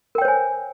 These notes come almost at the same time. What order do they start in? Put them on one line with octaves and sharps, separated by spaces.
A#4 G5 C#5 C5 G#5